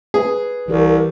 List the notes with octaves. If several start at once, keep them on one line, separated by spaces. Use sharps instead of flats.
G#4 B4
C2 E3 G4 A#4